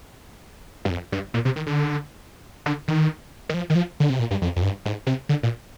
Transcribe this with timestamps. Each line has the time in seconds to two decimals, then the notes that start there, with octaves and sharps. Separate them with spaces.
0.85 G2
0.90 F2
1.12 G2
1.34 A#2
1.45 C3
1.56 D#3
1.66 D3
2.66 D3
2.88 D#3
3.49 D#3
3.54 F3
3.70 D#3
3.75 F3
4.00 D3
4.10 C3
4.19 A#2
4.31 G2
4.42 F2
4.56 F2
4.62 G2
4.85 G#2
5.07 C3
5.29 D3
5.43 A#2